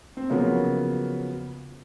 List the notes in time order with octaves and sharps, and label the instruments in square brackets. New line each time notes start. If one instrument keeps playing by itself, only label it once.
[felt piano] C4
C#3 F3 F#3 A#3 B3